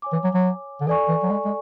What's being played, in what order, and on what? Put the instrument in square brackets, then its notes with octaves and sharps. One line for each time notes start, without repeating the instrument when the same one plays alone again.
[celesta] C#5 G#5 D6
[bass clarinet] E3
F#3
F#3
D3
[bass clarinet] E3 [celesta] A4 D5 G#5 C#6
[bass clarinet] E3
F#3
G#3
G#3